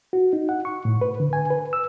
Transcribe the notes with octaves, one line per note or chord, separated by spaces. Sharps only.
F#4
D#4
F#5
C#6
A2
B4
D3
G#5
B4
E6